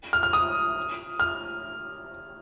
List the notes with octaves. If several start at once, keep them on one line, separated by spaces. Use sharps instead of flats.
F6
F6
D#6
F6